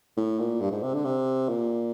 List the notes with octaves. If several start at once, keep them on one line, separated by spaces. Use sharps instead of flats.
A2
A#2
G2
G#2
C3
D3
C3
A#2